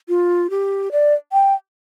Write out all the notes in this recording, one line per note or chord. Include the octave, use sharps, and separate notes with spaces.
F4
G4
D5
G5